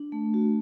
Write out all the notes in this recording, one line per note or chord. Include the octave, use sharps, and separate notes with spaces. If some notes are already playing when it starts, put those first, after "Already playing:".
Already playing: D4
A3
F#4